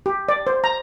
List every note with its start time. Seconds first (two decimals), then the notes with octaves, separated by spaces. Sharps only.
0.06 G4
0.29 D5
0.47 C5
0.64 A#5